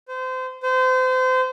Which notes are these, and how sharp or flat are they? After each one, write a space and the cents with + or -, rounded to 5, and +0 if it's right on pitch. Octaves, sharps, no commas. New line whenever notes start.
C5 -30
C5 -30